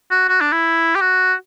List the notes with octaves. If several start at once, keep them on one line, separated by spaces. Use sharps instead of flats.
F#4
F#4
D4
E4
G4
F#4